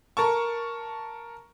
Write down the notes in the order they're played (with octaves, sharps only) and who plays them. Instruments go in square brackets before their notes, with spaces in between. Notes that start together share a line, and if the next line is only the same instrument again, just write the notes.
[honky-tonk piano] A#4 A5 C#6